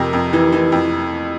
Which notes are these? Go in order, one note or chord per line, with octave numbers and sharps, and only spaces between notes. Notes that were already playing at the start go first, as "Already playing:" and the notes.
Already playing: F2 C3 A#4
F2
E3
E3
F2